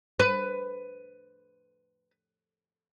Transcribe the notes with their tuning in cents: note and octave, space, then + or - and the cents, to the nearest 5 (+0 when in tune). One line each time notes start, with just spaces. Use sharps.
B4 +15